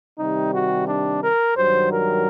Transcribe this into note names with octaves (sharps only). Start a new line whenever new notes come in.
C3 D#3 G3 D#4
F#4
D4
A#4
G2 D#3 F#3 C5
A#4